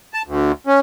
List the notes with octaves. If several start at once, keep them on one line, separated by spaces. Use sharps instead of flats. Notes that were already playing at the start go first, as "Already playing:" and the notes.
A5
D2
C#4